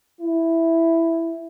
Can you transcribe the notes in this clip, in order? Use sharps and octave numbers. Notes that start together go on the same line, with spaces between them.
E4